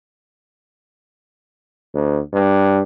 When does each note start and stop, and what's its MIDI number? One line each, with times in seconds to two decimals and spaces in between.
1.95 2.21 38
2.33 2.82 43